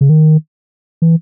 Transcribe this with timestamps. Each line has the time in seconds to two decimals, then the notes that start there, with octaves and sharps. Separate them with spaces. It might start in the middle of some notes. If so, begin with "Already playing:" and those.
0.01 C#3
0.09 D#3
1.02 E3